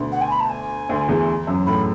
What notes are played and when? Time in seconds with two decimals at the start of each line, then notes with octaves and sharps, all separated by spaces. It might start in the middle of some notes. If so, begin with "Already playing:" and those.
Already playing: D2 B2 D3 B3
0.12 F#5
0.21 G#5
0.31 B5
0.40 A5
0.50 G#5
0.89 D2 D3
1.08 E2 E3
1.47 F#2 F#3
1.66 A2 A3 B5